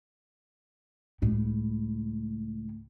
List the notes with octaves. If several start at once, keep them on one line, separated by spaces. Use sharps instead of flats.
C#2 A2